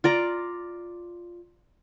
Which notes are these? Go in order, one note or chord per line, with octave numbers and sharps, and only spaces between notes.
F4 D5 A#5